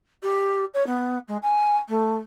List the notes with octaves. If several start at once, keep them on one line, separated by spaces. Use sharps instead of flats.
G4
C#5
B3
G#3
G#5
A3